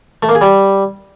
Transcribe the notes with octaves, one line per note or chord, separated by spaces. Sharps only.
A3
A#3
G#4
G3